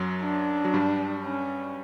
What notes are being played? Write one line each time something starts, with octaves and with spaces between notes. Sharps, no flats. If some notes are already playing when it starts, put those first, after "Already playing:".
Already playing: F#2 F#3
D4
F#3
G2 G3
C#4